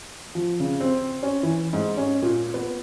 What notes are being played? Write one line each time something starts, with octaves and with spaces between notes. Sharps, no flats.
F3
C#3
C4
C#4
E3
G#2
C#4
A#2
B3